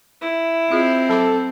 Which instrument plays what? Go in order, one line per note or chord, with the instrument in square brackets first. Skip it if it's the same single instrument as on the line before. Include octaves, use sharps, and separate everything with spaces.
[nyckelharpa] E4
[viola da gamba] C4 [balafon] F4 G#4 D#5
[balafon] F#3 B5 D6 [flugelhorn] A4